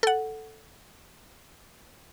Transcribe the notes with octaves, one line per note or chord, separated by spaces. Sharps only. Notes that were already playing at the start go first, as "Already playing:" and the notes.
A4 F#5